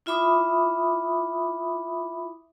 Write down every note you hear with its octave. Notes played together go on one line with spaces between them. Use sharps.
E4 F4 E5 B5 D6 D#6